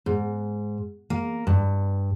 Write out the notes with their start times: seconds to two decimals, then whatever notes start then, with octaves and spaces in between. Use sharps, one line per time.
0.06 G#2
1.10 A#3
1.47 G2